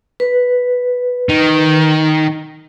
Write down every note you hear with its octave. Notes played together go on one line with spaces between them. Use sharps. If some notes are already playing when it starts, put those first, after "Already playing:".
B4
D#3